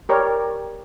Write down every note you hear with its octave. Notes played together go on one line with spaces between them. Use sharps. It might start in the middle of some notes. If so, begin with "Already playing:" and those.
G4 A#4 C#5 D5